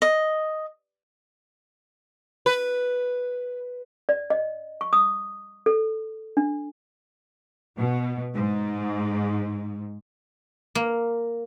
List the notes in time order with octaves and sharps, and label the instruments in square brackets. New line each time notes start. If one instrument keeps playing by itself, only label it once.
[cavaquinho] D#5
[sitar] B4
[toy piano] D5
D#5
C#6
D#6
A4
D4
[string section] B2
G#2
[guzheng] A#3